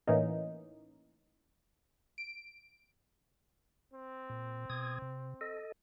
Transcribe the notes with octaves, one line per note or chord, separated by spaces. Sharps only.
A2 E3 A#3 C#4 D#4
D7
C4
A#2
B2 D#6 G#6
C3
A4 D#5